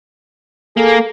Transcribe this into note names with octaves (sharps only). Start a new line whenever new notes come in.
A#3 G#4 A4